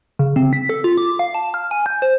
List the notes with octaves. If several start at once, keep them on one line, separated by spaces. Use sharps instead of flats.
C#3
C4
B6
A4
F4
D6
F5
A5
F6
G#5
G6
C5